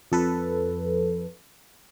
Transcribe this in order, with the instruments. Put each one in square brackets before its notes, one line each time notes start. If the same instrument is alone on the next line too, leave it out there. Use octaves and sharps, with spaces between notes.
[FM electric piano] F2 A4 B4